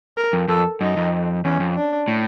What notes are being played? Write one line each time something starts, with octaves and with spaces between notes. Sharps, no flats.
A#4
F2
F2 A4
F#2 D#4
F2
E2 C#4
F2
D4
A2